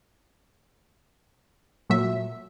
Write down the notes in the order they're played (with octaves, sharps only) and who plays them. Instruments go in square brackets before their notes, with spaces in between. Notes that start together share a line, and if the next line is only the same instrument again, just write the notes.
[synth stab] A#2 F#3 E5